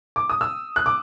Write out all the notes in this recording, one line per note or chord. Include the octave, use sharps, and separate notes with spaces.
D6
D#6
E6
F#6
D6